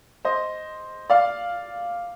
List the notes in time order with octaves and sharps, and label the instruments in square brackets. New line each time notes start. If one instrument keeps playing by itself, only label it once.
[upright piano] C5 D#5
D5 F5